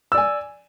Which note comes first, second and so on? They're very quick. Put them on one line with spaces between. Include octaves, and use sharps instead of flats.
E6 D5 G#5